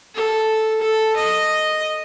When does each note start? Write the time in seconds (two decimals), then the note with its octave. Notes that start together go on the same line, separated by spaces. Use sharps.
0.15 A4
0.81 A4
1.16 D#5